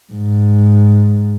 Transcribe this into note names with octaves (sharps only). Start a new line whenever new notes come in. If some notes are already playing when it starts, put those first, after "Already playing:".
G#2